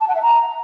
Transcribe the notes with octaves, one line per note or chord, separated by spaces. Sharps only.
A5
F#5
E5
A#5